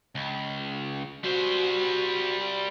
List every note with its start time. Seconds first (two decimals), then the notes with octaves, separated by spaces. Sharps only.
0.15 C#2
1.23 G3 F#4 C5